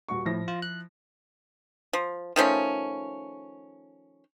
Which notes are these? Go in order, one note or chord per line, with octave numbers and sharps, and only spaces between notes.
D#1 F#4 C#6
A2 F3 E4 A#6
F4
F#6
F3
D#3 F3 A3 C#4